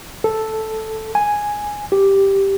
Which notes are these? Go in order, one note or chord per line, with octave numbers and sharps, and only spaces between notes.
A4
G#5
G4